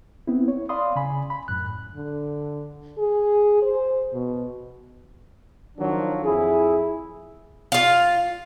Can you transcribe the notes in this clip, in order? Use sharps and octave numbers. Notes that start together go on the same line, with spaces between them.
B3 C4 E4
C#5
D5 F5 B5 C6 D#6
C#3 G#5 B5
B5
F#2 A2 F#6
D3
G#4
C5
B2
D#3 F3 F#3 D4
F2 E4 G#4
F4 F5